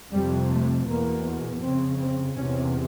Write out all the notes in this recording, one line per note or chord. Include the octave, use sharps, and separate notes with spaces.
F2 C3 G3
A3
E2 B2 A#3
F2 C#3 C4
C4
E2 C3 C#4